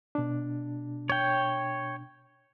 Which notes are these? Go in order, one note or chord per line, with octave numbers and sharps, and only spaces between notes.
B2 D4
C#5 G5